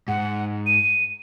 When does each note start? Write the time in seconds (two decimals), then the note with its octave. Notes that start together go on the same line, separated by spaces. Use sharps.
0.08 G#2 F#5
0.66 D#7